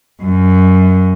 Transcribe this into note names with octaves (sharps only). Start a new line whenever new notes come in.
F#2